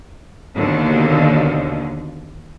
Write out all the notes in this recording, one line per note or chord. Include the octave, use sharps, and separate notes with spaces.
D#2 B2 D3